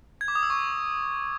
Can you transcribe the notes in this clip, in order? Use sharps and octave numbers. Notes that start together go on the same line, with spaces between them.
G#6
D6
D#6
E6
C#6